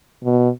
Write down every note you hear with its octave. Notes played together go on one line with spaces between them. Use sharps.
B2